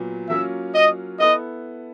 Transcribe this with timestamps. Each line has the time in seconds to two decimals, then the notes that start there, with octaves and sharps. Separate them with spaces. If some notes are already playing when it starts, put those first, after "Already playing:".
Already playing: A#2 F#3 B3
0.29 F#3 A#3 C#4 F4 A#4 E5
0.75 D#5
1.20 B3 E4 A4 D#5